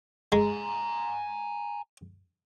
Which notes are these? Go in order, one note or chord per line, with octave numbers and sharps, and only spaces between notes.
G#3 G#5 A#5